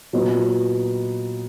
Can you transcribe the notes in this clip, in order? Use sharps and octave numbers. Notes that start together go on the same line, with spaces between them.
A#2 F#3 B3 D#4